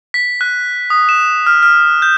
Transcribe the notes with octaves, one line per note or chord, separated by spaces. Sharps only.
B6
F#6
D#6
E7
F6
F6
G6